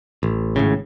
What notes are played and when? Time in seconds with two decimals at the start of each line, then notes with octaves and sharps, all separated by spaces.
0.23 A1
0.56 G#1 A2 C#3